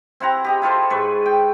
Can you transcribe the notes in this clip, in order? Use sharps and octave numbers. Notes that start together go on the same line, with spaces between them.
C4 E4 F#5 A#5
G4 D#5 B5
E4 F4 A4 C5
G#2 B4 C#6
G5